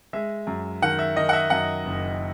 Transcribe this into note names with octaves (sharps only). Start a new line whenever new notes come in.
G#3 E5
F#2
D#3 F#5
E5
D#3 D#5
F#5
E5
F#2 F#5
F#1